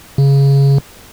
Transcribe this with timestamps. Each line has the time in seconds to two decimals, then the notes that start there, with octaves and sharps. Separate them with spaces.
0.18 C#3